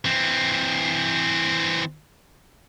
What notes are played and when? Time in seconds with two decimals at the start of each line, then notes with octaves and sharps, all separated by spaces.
0.05 E3 C4